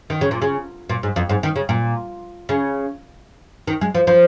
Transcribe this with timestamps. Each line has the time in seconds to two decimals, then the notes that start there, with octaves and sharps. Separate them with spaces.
0.10 D#3
0.21 C#3
0.31 A#2
0.42 C#3
0.89 A#2
1.03 G#2
1.16 F2
1.29 G#2
1.43 D#3
1.56 C#3
1.69 A#2
2.49 C#3
3.67 D#3
3.81 G#3
3.94 F3
4.07 F3